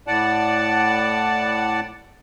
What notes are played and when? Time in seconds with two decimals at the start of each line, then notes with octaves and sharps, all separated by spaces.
0.07 A2 D5 F#5 A5